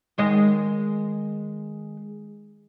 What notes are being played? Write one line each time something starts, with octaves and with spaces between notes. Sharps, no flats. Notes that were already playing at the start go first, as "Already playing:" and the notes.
D#3 G#3 D#5